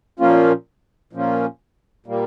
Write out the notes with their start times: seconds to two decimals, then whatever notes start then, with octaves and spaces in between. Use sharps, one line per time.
0.19 A#2 F3 A#3 C#4 F4
1.13 A#2 F3 A#3 C#4 F4
2.06 A#2 G3 A#3